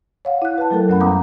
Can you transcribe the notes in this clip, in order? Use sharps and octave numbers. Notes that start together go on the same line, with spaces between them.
C#5 F5 F#5
E4 F#6
B4 A5
F#3 A3 A4 A#4
F#2 C#4 F#5 B5
G3 B3 A#5 D6 D#6